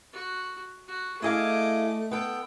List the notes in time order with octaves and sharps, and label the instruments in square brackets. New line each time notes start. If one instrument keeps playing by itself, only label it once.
[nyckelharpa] F#4
F#4
[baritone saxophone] A3 [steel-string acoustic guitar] E4 G#4 F5 [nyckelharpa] D#5 D6
[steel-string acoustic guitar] B3 A4 [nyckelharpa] G5